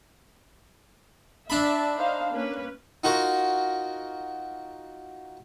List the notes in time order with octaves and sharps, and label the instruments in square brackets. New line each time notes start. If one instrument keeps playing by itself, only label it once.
[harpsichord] D4 B5 [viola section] D5 E5 A5
[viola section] D#4 C5 F5
A#3 C#4 B4
[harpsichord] D#4 F4 F#4 A#4